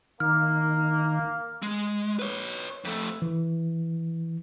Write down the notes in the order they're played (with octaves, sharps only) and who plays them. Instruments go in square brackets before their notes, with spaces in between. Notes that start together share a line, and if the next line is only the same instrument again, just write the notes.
[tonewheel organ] D#3 [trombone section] A#3 [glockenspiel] F6
[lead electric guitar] G#3
B4 C#5
F2 A3
[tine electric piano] E3